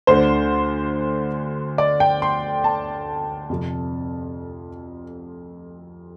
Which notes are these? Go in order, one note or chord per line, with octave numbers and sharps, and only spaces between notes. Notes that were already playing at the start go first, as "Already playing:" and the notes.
D2 D3 C5
D5
G5
C6
A5
F2 C3